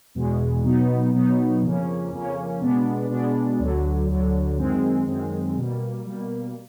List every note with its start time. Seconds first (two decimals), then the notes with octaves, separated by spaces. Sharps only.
0.15 E2 B2 G#3
0.64 B2 F#3 B3 D#4
1.13 B2 F#3 B3 D#4
1.62 F2 C#3 F3 A#3 C#4
2.11 F2 C#3 F3 A#3 C#4
2.61 B2 G#3 B3 D4
3.09 B2 G#3 B3 D4
3.59 D2 D3 F#3
4.09 D2 D3 F#3
4.58 F#2 D#3 G#3 C4
5.07 F#2 D#3 G#3 C4
5.56 B2 G3 A#3
6.06 B2 G3 A#3